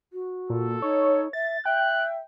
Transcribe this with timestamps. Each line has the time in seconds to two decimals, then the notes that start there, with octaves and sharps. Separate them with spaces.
0.13 F#4
0.50 A#2 A4
0.82 D#4 C#5
1.33 E5 A6
1.65 E5 G5 F#6